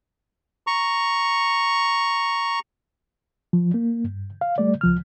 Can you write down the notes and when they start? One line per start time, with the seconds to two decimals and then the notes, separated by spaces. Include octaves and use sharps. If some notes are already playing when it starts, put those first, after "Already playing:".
0.67 A#5 C#6
3.53 F3
3.74 A#3
4.04 G2
4.41 F5
4.58 G3 A3 D5
4.81 C#2 F3 F6